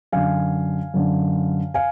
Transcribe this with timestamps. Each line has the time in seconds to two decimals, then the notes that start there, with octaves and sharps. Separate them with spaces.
0.12 F#2 D3 F5 G#5
0.94 F#2 D3
1.74 F5 G#5